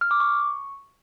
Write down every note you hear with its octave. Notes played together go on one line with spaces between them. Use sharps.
F6
D6
C#6